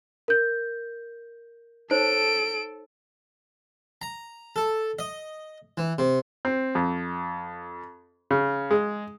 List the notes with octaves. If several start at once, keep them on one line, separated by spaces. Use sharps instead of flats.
A#4 G6
D#4 A4 C5 C#5 D7
A#5
A4
D#5
E3
C3
C4
F2
C#3
G#3